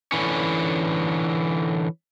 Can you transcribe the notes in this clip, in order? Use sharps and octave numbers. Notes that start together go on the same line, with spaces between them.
D3 E3 C#4